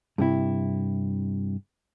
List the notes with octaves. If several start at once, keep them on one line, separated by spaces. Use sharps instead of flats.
G2 C3 E4